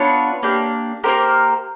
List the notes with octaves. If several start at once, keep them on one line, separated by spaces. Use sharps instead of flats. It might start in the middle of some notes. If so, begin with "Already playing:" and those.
Already playing: B3 D4 F4 B4 C#5
A#3 D4 G4
A#3 D4 G4 A#4 C5